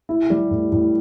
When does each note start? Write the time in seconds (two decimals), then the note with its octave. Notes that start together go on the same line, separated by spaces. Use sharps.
0.09 E4
0.30 G3
0.51 A2
0.72 A2